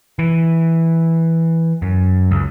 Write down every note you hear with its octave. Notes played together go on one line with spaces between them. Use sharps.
E3
F#2
C#2